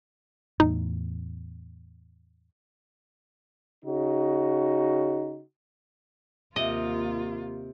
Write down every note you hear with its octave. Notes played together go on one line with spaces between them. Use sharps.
E2 A2 D#4
C#3 D#4 F#4
D#2 C3 A#3 F4 D#5